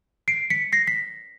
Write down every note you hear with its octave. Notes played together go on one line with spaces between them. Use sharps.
C7 D7
B6 C#7
A#6 C7
B6